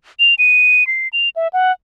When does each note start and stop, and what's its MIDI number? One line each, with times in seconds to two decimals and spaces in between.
0.20 0.34 101
0.38 0.87 99
0.87 1.08 96
1.13 1.29 101
1.36 1.48 76
1.53 1.72 78